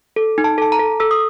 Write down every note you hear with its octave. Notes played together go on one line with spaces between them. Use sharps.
A4
D#4
A5
A4 A5
A#5
A4
A4 E6
D#6